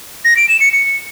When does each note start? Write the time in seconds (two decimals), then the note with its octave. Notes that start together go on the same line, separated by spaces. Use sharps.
0.25 A#6
0.37 D7
0.49 E7
0.61 C#7
0.72 C#7